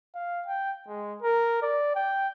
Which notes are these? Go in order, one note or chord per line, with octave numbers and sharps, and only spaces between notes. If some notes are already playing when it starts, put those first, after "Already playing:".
F5
G5
G#3
A#4
D5
G5